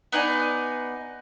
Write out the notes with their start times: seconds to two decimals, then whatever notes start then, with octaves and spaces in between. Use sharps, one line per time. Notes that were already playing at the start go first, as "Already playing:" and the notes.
0.12 B3 D#4 D5 G#5